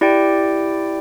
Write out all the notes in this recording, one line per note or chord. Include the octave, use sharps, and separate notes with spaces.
E4 G4 D5 G5